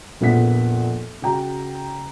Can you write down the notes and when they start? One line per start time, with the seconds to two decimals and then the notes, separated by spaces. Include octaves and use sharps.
0.20 A#1 F2 A#2 B3 F#5 B6
1.22 C#3 F#4 G5 A#5